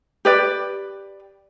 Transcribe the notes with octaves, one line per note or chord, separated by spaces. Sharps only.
G4 B4 D5